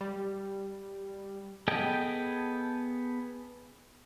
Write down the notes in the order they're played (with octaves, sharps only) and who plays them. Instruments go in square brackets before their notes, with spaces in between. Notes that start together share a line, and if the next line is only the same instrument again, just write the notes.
[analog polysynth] G3
[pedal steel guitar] B3 G#4 A4 D#5 G5